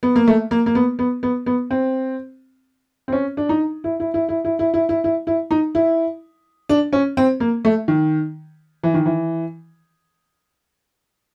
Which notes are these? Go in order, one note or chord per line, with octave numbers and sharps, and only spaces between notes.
B3
A#3
A3
A#3
A#3
B3
B3
B3
B3
C4
C4
C#4
D4
D#4
E4
E4
E4
E4
E4
E4
E4
E4
E4
E4
D#4
E4
D4
C#4
C4
A#3
A3
D#3
E3
D#3
E3